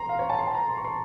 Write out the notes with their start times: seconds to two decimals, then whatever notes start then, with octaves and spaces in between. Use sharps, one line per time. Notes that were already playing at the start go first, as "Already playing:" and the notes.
Already playing: A#5 C6
0.09 F5
0.19 C#5
0.29 A5
0.39 C6
0.47 A5
0.55 A#5
0.69 C6
0.77 C#6
0.84 C6